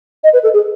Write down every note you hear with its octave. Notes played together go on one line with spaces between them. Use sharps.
D#5
B4
A4
G#4